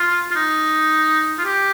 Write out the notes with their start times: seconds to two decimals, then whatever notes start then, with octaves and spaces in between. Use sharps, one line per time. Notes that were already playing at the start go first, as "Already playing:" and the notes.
Already playing: F4
0.31 F4
0.36 D#4
1.38 F4
1.45 G4